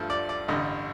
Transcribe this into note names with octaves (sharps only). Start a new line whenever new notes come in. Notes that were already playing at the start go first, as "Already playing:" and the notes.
Already playing: G2 F3 A3
D5
D5
A1 G2 D3 D#5